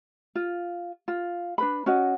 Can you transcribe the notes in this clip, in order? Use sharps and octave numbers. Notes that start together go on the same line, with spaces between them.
F4
F4
D4 B4 B5
C#4 F#4 D#5